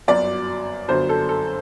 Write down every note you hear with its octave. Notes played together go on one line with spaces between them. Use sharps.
G1 F#2 F#3 D5
G1 F#2 D3 C5
A4
A4